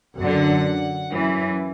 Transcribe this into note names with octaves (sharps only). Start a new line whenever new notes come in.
F#2 D3 F#5
F#2 E3